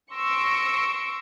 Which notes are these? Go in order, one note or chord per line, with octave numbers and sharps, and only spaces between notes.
C6 C#6 E6 A#6 C#7 D7